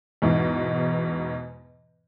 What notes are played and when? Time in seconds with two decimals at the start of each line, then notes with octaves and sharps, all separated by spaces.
0.22 E2 G#2 B2